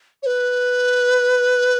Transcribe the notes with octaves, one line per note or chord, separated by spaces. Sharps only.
C#5
B4